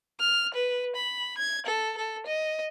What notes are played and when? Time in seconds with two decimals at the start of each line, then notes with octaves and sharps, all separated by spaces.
0.20 F6
0.54 B4
0.96 B5
1.38 G#6
1.66 A4
1.97 A4
2.26 D#5